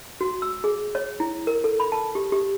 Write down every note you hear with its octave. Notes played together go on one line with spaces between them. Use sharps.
F#4
E6
G#4
C#5
E4
A#4
A4
B5
A5
G4
G4